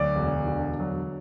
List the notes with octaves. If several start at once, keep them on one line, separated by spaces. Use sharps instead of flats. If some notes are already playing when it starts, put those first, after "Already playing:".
Already playing: D2 F#3 D5
E1
D3
F#3